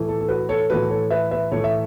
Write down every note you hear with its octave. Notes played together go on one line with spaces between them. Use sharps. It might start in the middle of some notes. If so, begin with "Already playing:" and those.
Already playing: A2 E3 A3
A4
A4
F#4 B4
A4 C#5
A2 E3 A3 F#4 B4
A4 C#5
B4 E5
B4 E5
A2 E3 A3 C#5
E5